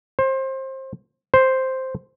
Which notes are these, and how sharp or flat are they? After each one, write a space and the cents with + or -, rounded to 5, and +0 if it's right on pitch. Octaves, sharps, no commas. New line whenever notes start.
C5 +25
C5 +0